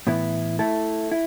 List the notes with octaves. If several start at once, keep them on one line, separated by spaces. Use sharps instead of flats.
A2 E3 B3 E4
A3 E4 A4
E4